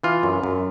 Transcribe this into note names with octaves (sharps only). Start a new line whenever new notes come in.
E3 F4
F#2
F#2